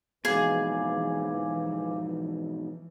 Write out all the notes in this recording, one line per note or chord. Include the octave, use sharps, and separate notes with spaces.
G#2 B2 E3 F3 G#4 F5 D6